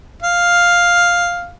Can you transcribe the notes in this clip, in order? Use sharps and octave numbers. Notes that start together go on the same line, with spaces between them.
F5